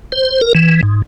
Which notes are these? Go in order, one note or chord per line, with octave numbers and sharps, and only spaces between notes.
C5
A#4
E3
G#2